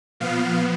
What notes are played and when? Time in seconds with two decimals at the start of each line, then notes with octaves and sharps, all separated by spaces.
0.20 A#2 F3 B3 F5